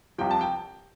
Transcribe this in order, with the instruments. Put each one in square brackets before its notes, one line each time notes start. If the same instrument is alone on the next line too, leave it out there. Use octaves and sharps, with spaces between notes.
[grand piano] C2 C3 F3 G5
A5
G5